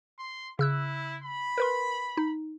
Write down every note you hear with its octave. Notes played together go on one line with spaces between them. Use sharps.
C6
C#3 E4 E6 F#6
B5
A#4 B4 C6
D#4